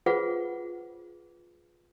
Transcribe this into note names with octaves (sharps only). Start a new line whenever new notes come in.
F4 G#4 B4 C5 F#5